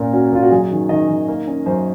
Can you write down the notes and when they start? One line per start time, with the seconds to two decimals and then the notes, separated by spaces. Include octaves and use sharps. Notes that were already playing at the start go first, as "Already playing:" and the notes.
Already playing: A#2 C#4 A#4
0.13 C#4 F#4
0.32 A#2 F4
0.43 F#4
0.51 F#2 G#4
0.71 D#3
0.89 D#3 D#5
1.09 D#3
1.28 A#3
1.47 C#4
1.66 F#2 C5